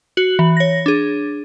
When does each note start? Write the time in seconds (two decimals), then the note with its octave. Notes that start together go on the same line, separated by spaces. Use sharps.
0.17 F#4 F#7
0.39 E3
0.57 C#5 A#6
0.86 D4 G#4